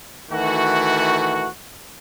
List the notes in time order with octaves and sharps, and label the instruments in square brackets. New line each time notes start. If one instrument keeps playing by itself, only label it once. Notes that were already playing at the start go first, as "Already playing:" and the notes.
[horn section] D#3 E3 A3 F#4